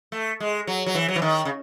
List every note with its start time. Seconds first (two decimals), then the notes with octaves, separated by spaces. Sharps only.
0.12 A3
0.40 G#3
0.67 F#3
0.86 F#3
0.95 E3
1.08 F#3
1.16 E3
1.22 D#3
1.45 C#3